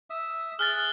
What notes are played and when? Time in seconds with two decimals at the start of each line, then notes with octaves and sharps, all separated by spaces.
0.10 E5 D#6 E6
0.59 G#4 F6 F#6 A6